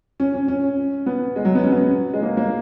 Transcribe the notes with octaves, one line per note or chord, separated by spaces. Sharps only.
C#4
C#4
C#4
B3
G#3
F#3
B3
C#4
B3
G#3
A#3
A#3